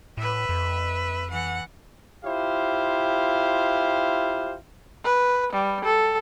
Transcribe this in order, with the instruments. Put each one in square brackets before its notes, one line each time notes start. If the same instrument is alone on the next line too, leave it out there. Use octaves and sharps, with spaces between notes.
[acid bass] A2 [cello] B4 E5
[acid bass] F2
[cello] E3 F#5
[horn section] E4 F4 G4 C5 F5
[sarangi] B4
G3
A4